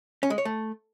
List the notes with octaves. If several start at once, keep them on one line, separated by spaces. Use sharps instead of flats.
C#4
G#3
C#5
A3